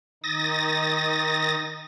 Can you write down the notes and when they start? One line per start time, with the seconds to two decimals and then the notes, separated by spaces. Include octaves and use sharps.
0.24 D#3 D#4 D#6 A6 A#6